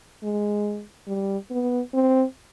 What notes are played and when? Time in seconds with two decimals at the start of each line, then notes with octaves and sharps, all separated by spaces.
0.23 G#3
1.07 G3
1.51 B3
1.94 C4